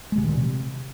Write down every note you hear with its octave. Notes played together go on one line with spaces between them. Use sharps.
G#3
C3
D#3
A#2
C3